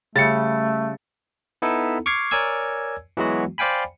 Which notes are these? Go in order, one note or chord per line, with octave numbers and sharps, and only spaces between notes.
C#3 G3 A3 A6 C#7
B3 D#4 E4 A4
C#6 D6 F6 G#6 C7
A#4 C#5 D5 G#5 E6 G#6
E3 F#3 G#3 B3 F#4
C5 D5 F5 G5 G#5 B5